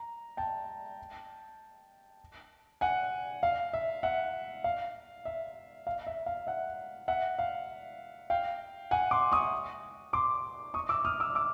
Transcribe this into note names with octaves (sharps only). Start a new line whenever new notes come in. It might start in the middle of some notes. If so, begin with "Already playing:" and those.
Already playing: A#5
G5 A5
F#5 G#5
F5
E5
E5 F#5
F5
E5
F5
E5
F5
E5 F#5
E5 F#5
F5
F5 G5
F#5 G#5
C6 D6
C#6 D#6
C6 D6
C#6 D#6
D6 E6
D#6 F6
D6 E6
D6 E6